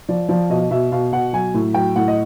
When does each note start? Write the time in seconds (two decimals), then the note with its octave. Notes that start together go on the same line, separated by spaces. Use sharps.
0.09 F3 D5
0.28 F3 D5
0.50 B2 D#5
0.71 B2 E5
0.92 B2 F5
1.12 B2 F#5
1.33 F#3 G#5
1.54 A2
1.74 F#3 G5
1.96 A2 F#5
2.08 D#5